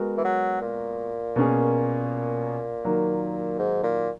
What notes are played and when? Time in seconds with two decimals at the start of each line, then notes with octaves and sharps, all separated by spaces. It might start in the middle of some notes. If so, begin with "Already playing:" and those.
Already playing: G#3 B3 F#4 A#4
0.18 E3
0.25 F#3
0.61 A#2
1.36 B2 A#3 C#4 G#4
2.84 D#3 F#3 A#3
3.59 G#2
3.84 A#2